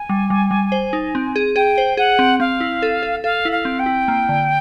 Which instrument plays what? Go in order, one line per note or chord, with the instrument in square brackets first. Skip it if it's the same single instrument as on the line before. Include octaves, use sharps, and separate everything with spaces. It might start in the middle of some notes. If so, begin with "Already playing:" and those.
Already playing: [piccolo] G#5
[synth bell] G3
G3
G3
C5
D#4
C4
G#4
[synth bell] G#4 [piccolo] G5
[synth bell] C5
[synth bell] G#4 [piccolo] F#5
[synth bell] C4
[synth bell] C4 [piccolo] F5
[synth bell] E4
A4
A4
[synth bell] A4 [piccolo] F5
[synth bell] E4
[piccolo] F5
[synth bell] C4
[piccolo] G5
[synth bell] E4
A#3
D3